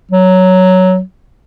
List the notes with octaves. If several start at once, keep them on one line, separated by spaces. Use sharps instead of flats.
F#3